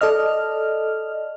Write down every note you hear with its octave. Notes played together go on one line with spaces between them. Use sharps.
A4 D5 D#5 F6